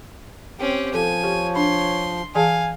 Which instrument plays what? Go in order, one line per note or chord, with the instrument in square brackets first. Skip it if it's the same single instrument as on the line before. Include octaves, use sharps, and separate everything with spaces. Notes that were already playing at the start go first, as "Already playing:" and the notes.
[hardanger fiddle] C4 C#4 [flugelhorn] G4
[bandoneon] F3 [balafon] A4 [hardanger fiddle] G#5
[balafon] G4 [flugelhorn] C#5
[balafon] D4 B5 [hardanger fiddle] C6
[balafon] E3 G#4 A5 [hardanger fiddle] F5 [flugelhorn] G#5